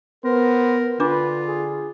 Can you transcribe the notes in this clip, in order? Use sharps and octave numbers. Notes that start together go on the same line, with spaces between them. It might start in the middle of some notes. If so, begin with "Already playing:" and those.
B3 A#4 C5
D3 D4 F4 B4 D6
G#4